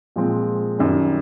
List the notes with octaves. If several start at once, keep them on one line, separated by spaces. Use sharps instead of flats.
A#2 F3 G#3 C4
F#2 D#3 G3